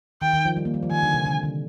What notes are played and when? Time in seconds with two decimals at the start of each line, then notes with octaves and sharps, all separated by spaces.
0.22 D#3 G5
0.33 D#3
0.45 F3
0.56 G3
0.65 A#3
0.74 G3
0.83 F3
0.91 D#3 G#5
1.03 D3
1.14 C3
1.25 D3
1.43 D3